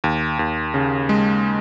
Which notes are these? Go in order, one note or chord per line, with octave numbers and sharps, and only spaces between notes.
D#2
D#2
C#3
G#3